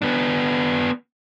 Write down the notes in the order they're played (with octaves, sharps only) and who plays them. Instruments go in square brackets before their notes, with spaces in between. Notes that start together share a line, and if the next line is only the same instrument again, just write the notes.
[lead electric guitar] B3 D4